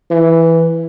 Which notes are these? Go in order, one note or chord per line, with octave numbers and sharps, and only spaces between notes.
E3